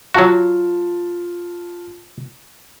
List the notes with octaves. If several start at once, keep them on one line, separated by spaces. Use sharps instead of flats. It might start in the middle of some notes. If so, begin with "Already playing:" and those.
F#3 F4 F#4 A5